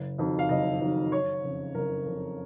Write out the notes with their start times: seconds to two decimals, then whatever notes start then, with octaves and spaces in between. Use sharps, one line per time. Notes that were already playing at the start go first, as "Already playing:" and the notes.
Already playing: F#1
0.18 F2 D#3 F#3
0.39 F5
0.49 F#1 D#5
0.80 F2 D#3 F#3
1.12 F#1 C#5
1.44 F2 C#3
1.74 F#1 A#4
2.06 F2 C#3